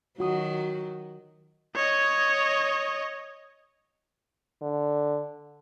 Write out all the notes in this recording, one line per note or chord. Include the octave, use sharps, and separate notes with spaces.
D#3 F#3 F4 F#4 D#6
C#5 D#5
D3